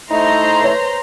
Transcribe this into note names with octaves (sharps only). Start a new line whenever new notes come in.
A3 D#4 E4 C5 A#5 C6
B4 C#5